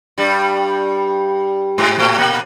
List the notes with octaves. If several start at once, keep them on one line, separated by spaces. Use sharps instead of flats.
G2 G3
G#2 G#3
A2 A3
A#2 A#3